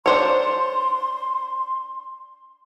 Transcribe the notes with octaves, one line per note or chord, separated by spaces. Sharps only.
D4 C5 C#5 C6